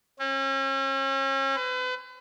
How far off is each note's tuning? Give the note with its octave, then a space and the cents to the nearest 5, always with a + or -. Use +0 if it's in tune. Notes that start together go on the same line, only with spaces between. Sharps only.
C#4 -40
B4 +40